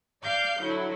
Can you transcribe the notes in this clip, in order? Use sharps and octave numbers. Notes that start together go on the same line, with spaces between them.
D5 F5 D6 G6
D3 F#3 E4